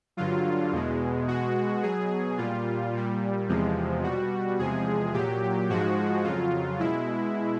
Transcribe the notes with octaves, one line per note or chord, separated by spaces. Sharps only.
G2 D3 F#3 F4
E2 B2 G#3
B2 G#3 F#4
B2 F#3 G#4
A#2 G3 F4
A#2 G3
E2 C3 F3 G#3
B2 G3 F#4
E2 C3 F3 G#3 G#4
A#2 F#3 G4
G#2 F3 G#3 F#4
F2 C#3 F#3 F4
B2 G#3 E4